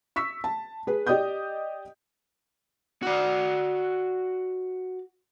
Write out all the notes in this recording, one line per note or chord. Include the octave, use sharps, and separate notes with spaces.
C#6 E6 B6
A5
G#4 B4
G4 D5 D#5 G5 D#6 G6
F#4 D5